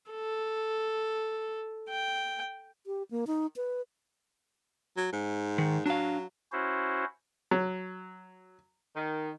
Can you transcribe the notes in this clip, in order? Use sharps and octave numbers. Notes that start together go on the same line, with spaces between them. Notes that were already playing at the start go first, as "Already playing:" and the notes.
A4
G5
G4
A#3
D#4
B4
F#3
G#2
D#3
F#3 D4 F5
C#4 E4 F#4 C5
F#3
D#3